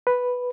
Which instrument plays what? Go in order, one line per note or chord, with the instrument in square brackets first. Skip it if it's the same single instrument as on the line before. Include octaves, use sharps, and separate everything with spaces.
[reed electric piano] B4